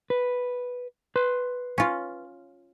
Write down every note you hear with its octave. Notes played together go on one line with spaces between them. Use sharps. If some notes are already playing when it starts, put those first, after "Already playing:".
B4
B4 C6
C#4 F4